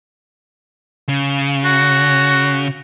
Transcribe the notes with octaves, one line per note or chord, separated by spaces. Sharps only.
C#3
F#4